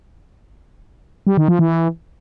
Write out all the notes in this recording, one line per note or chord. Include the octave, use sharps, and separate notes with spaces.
G3
D#3
F3
E3